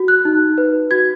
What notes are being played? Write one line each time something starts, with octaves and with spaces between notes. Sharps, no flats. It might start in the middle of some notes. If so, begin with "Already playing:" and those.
Already playing: F#4
F#6
D#4
B4
F#4 G#6